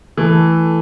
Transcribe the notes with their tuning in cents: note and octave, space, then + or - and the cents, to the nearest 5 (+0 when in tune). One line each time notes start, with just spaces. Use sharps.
E3 +0 A3 +0 A4 +5